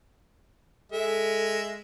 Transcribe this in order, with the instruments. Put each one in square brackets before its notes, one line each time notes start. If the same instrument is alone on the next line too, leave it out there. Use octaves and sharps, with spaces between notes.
[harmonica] G#3 E5 [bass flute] A4